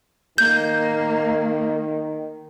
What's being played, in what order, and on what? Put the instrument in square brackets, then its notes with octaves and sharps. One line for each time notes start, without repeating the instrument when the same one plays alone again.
[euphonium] D#3 [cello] A#3 [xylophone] G6